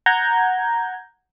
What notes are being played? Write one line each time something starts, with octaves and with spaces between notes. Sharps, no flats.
F#5 A#5 G6 G#6